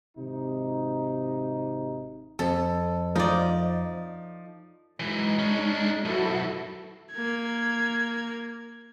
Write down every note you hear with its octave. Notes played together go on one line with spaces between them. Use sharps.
G#1 C3 D#4
F2 A4
F3 D#4 D5
F#2 E3 G#3 D#4
C#4 D4
B1 F#2 E4 F#4 A4
A#3 G#6